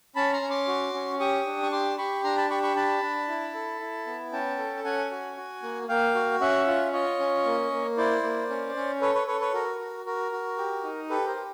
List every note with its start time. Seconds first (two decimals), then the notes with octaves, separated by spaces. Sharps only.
0.16 C#4 A5 B5
0.33 A#5 C6
0.42 C#4
0.50 C6 D6
0.68 F#4
0.94 C#4
1.20 G4 C#6 D#6
1.46 D4
1.62 C#6
1.72 G4 C6 D6
1.98 G4 B5 C#6
2.24 D4 A#5 C6
2.37 A5 B5
2.50 G4 B5 C#6
2.63 B5 C#6
2.76 D4 A5 B5
3.02 D4
3.28 E4
3.54 A4
3.80 E4
4.06 B3
4.32 C#4 G5 A5
4.59 A4
4.84 C#4 F#5 G#5
5.11 F#4
5.37 F#4
5.63 A#3
5.89 A#3 F5 G5
6.15 F#4
6.41 C#4 E5 F#5
6.67 F4
6.93 F4 C#5 D#5
7.19 C#4
7.45 A#3
7.72 A#3
7.97 E4 C5 D5
8.23 A#3
8.50 C#4
8.75 C#4
9.01 A4 B4 C#5
9.14 B4 C#5
9.27 A4 B4 C#5
9.40 B4 C#5
9.54 F#4 A#4
9.80 F#4
10.06 F#4 A#4
10.32 F#4
10.58 G4
10.84 D#4
11.10 G4 A4 B4
11.27 A#4 C5
11.36 G4